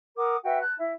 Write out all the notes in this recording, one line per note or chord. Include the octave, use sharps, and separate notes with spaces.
A#4 F#5 D6 D#6
F#4 B4 E5 G5
A5 F#6
E4